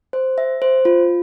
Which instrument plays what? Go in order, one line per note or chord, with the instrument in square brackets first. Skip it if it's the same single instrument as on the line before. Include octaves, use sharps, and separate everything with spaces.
[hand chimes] C5
E5
C5
F4